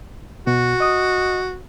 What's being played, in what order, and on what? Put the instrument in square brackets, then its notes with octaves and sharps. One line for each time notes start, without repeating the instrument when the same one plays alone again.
[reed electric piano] B2 [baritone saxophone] F#4
[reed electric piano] D#5 D#6